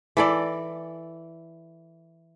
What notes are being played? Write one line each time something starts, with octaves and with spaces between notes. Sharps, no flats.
E3 A4 D5